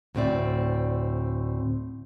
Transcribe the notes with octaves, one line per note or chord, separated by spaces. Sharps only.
D2 A2 C4 D5